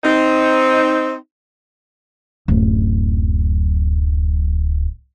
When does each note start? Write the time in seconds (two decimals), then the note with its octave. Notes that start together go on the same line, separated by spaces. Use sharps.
0.04 C4 D#4
2.48 D1 F#2